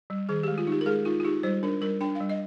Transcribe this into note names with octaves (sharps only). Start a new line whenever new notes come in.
G3
D#3 G#4
G#3 G4
F4
D#4 G4
A#4
G#3 G#4
D#4 F4
F4
D#4 G4
G3 C5
D4 A#4
G3 A#4
D4 G5
G3 F5
D#5